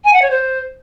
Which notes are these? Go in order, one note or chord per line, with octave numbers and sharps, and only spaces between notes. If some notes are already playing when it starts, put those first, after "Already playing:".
G#5
F#5
C#5
C5